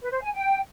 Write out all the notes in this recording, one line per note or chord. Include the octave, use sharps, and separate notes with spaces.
B4
C5
G#5
G5